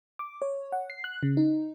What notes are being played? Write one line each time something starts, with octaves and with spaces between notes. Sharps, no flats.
D6
C#5
F#5
C7
F#6
C#3
D#4